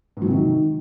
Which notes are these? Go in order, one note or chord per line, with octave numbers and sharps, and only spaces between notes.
G#2
F#3
C3
D#3